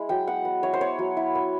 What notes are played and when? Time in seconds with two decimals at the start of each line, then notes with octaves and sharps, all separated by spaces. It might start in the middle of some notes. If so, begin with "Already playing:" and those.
Already playing: G#3 E4
0.09 F#3 G5
0.27 B3 F#5
0.45 B3
0.63 E4 C#5
0.73 C5
0.81 B3 C#5
0.99 F#3
1.17 E4
1.35 B3